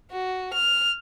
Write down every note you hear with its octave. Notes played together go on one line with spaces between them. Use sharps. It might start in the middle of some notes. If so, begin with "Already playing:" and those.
F#4
F6